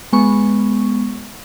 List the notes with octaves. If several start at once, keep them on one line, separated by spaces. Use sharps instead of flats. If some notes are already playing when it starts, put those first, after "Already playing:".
G#3 B3 C#6